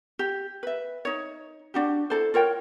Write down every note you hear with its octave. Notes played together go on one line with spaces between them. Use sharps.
G4
B4 E5
D#4 C#5
D4 F#4 G4
E4 A4 C5
F4 A#4 C#5 G5